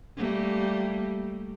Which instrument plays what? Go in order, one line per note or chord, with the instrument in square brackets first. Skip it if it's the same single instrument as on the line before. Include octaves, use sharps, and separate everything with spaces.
[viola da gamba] G3 A3 A#3